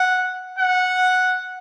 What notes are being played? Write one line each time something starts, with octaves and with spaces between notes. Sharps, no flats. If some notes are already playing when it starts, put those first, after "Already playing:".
Already playing: F#5
F#5